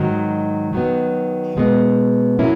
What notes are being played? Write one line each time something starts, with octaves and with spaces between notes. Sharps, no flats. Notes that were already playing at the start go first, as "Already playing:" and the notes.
Already playing: G#2 D#3 F#3
D#3 F#3 B3
B2 G#3 B3
F#3 A#3 C#4 E4